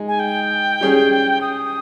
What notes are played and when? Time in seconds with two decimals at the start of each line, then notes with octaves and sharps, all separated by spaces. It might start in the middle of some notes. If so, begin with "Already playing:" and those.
Already playing: G#3 D#4 G#4
0.08 G#5
0.19 G5
0.81 G3 C#4 G#4
1.41 D#6